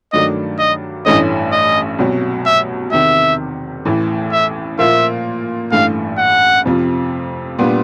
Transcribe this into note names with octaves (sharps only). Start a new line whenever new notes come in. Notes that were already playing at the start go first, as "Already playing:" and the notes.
G2 D#3 F#3 A3 D4 D#5
D#5
A1 G2 E3 A3 C#4 D#5
D#5
C2 B2 F#3
E5
E2 C3 D#3 E5
A1 A2 E3
E5
A#2 F3 A#3 E5
A1 G2 E3 A3 F5
F#5
F2 C3 F3
A#2 G3 B3 D4